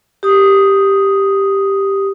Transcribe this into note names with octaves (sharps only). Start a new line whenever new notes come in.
G4 D#6